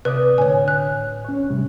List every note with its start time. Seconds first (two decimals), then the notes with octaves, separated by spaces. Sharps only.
0.05 C3 B4 D5 D#6
0.38 A2 D3 C#5 G#5
0.68 F#6
1.25 C#4 C#5
1.50 A2 C3 G3